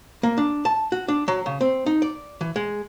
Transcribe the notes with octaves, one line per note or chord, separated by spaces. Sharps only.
A#3
D4
A5
F#4
D4
F#3
C#3
C4
D#4
D5
E3
G#3